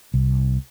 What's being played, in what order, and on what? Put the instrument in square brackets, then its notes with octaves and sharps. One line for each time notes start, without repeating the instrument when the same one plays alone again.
[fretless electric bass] C2